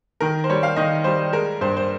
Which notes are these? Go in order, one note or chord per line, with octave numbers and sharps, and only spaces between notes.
D#3 A#4
C5
G3 C#5
F5
D#3 D#5
G3 C5
G#3 A#4
G2 C5
C5